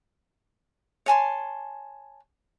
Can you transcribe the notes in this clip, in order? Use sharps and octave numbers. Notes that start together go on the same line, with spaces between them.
C#5 G#5 A5 C6